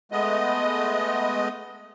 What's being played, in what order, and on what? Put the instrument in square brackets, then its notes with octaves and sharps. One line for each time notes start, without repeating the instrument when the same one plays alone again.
[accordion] G#3 A3 B3 D#5